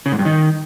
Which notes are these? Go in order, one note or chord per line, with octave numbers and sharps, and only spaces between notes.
C#3
G#2
G2
D#3